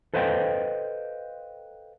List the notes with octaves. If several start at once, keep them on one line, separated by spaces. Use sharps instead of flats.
A4 B4 C5 D#5 F5 G5